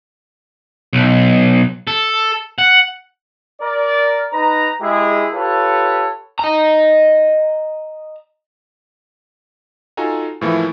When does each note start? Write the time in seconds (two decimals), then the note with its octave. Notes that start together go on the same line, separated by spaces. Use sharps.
0.93 B1
1.87 A4
2.58 F#5
3.61 A#4 D5
4.33 D#4 B4 A#5
4.81 G#3 E4 G4 G#4
5.33 F4 G4 A4 B4 C#5
6.39 D#5 A#5
9.97 D#4 F4 F#4 A4 G#5 A#5
10.41 A2 E3 F3 A#3 E4